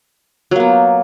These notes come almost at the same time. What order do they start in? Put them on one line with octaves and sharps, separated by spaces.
F#3 A#3 B3